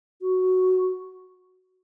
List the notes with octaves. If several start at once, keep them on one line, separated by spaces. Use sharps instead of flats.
F#4